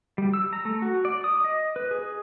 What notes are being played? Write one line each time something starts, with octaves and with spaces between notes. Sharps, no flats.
G3
E6
A#5
A3
F#4
D5
D#6
D#5
B4
G#4